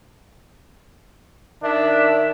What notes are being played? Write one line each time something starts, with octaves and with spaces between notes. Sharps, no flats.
D#3 D4 E5